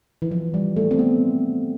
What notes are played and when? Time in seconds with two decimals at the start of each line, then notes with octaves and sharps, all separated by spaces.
0.22 E3
0.31 F3
0.54 G3
0.76 A3
0.91 C4
0.99 B3